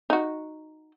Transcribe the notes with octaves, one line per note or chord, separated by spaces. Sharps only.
D#4 F#4